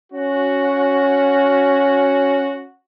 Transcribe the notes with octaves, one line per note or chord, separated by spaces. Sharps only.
C#4 F#4